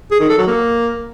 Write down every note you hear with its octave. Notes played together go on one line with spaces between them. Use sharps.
G#4
D#3
A4
F#3
A#3